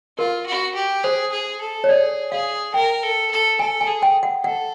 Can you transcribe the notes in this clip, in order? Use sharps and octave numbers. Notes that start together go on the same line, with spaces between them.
F4 A#4
F#4
G4
G#4 C5
G#4
A4
C#5
G#4 D5
G#4 F5
A#4 G5
A4
A4
A4 G#5
G#5
G#4
G5
F#5
A4 F#5